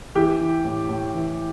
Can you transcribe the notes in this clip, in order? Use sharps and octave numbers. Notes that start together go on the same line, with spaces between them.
E3 G4
E3
A2
A2
E3